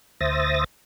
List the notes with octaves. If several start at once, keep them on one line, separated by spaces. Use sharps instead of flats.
D2 C5 E5 D#6 A6 A#6